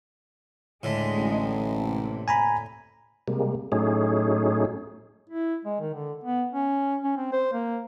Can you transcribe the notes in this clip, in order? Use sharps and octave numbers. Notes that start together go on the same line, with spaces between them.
D2 A2 D3 G#3 D#5
A1
C3 A#3
G#5 A#5 B5
C3 G3 G#3 A#3
A2 F#3 A3 C#4 D#4 G#4
E4
G#3
D#3
D3
B3
C#4
C#4
C4
C5
A#3